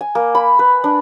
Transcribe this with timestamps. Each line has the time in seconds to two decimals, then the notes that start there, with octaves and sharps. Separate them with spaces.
0.01 G#5
0.15 A#3
0.35 B5
0.59 B4
0.84 D4